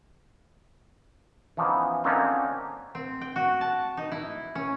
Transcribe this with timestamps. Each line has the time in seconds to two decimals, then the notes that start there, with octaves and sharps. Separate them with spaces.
1.57 E3 F3 B3 C#4 D#4
2.04 D3 A#3 C4 C#4 D#4 F4
2.95 C4
3.21 G5
3.36 F#4
3.61 A5
3.97 D#4
4.12 E4
4.55 C#4